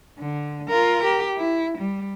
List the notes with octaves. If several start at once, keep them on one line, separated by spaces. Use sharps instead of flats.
D3
F4 A#4
G4
E4
G3